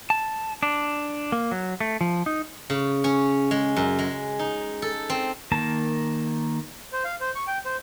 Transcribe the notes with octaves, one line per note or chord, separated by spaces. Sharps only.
A5
D4
A#3
F#3
A3
F3
D#4
C#3
C#4
G#3
F#2
G#3
D#4
A4
C4
D#3 A#3 A#4 A5
C5
F5
C5
C#6
G5
C5